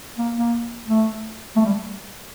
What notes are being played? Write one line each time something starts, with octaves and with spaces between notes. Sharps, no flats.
A#3
A#3
A3
A3
G3